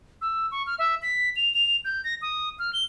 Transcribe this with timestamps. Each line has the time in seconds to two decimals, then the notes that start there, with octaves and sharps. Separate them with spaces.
0.22 E6
0.51 C#6
0.67 F6
0.79 E5
1.02 B6
1.36 F7
1.54 F7
1.85 G6
2.04 A#6
2.22 D#6
2.59 F6
2.73 G7